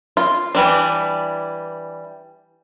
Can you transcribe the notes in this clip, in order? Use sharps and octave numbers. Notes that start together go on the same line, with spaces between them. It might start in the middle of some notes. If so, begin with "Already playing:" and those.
F4
E3 G3 D4